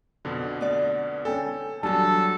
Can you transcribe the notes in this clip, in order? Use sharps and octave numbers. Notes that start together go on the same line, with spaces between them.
F2 B2 D3
B3 D5
C#4 A4 G5 G#5
E2 F#3 G3 D4 A4 A5